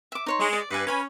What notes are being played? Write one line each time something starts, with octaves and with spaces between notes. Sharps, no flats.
E5 D6
D#4 C#5 C6
G#3
D5
G2 B4 D5 G#5
C#4 B4 G#5 B5